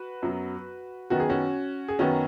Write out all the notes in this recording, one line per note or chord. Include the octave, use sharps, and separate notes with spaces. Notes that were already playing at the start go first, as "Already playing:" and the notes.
Already playing: F#4 B4
F#2 F#3 B3
F#2 D#3 B3 F#4
G#4
C#4 F#4
G#4
F#2 D#3 B3 C#4 F#4